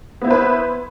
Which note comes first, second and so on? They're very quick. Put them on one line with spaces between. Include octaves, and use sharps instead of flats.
B3 E4 C5 B4